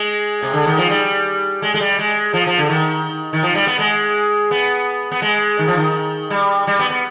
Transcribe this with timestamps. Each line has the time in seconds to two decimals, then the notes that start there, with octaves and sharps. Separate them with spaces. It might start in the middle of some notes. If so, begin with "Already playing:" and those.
Already playing: G#3
0.42 C3
0.53 D3
0.67 D#3
0.78 F3
0.90 G3
1.62 G#3
1.74 G#3
1.80 G3
1.99 G#3
2.34 F3
2.47 F3
2.58 D3
2.70 D#3
3.33 D#3
3.43 F3
3.55 G3
3.67 B3
3.79 G#3
4.51 B3
5.11 B3
5.22 G#3
5.59 D#3
5.68 F3
5.77 D#3
6.30 G3
6.67 G3
6.79 B3
6.90 B3